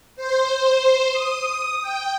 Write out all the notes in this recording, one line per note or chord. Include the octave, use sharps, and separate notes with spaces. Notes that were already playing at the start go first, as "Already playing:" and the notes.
C5
D#6
G5